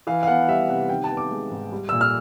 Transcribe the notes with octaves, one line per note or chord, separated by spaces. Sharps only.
E3 F5
F5
B3 F#5
G3 E5
C3 F#5
D#3 G5
A5
B3
D6
G#3
G#2
G3
A#2 E6
F6